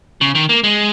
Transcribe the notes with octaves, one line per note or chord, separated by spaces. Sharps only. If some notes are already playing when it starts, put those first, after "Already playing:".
C#3
D#3
A#3
G#3